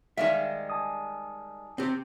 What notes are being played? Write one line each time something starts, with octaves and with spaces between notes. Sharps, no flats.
D#3 G3 G#3 E5 F5
G#5 A5 D#6
C4 G4